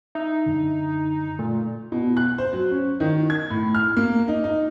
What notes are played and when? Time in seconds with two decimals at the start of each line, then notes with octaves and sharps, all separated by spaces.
0.15 D#4 E5
0.46 F#2 D3
1.39 A#2 A3
1.92 B2
2.17 F#6
2.38 C5
2.53 F#3
2.70 C#4
3.00 D#3
3.30 G#6
3.51 A2
3.75 F6
3.97 A#3
4.28 D#4
4.44 D#4